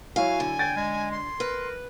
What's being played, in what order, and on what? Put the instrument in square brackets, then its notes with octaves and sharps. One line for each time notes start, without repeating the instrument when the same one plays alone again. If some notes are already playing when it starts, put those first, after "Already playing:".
[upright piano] F#3 E4 C#5 [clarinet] F#4 [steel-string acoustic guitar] F5 [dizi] G#5
[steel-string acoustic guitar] D3
[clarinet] G5 [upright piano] G#6 A6
[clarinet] G#3
[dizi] C6
[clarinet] A#4 [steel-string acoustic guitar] B4